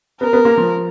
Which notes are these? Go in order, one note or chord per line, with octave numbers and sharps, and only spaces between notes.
B3 A#4
B3
A#3
F3